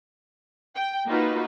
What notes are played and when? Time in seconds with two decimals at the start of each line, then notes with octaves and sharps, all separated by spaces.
0.75 G5
1.07 A#3 D#4 F4 F#4 B4